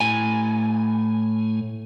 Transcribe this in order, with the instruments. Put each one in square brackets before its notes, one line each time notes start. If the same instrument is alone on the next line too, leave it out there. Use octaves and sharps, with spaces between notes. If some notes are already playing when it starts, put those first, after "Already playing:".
[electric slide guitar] A2 G#5